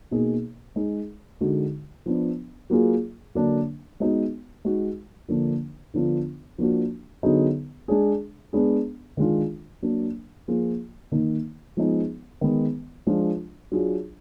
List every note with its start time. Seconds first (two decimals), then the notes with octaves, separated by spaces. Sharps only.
0.11 B2 A#3 D#4 G#4
0.76 G#3 D#4 G#4
1.41 D3 G#3 D#4 F#4
2.06 F3 B3 D4
2.70 F#3 A#3 F4 G#4
3.35 D3 F#3 A#3 D4
4.00 G#3 B3 D#4 F#4
4.65 G#3 D#4 F#4
5.29 D3 F3 A#3 D4
5.94 D3 F3 B3 D4 F4
6.58 F3 A#3 D4 F#4
7.23 D3 F#3 B3 D#4 G#4
7.88 G#3 D4 G#4
8.53 G#3 B3 D4 G#4
9.17 D#3 G#3 D4 F4
9.82 F#3 A#3 D4
10.48 F3 A#3 F4 G#4
11.12 D#3 A#3 D#4
11.77 F3 G#3 B3 D#4 G#4
12.41 D#3 G#3 B3
13.07 F3 G#3 D4 F4
13.72 F#3 D4 F4 G#4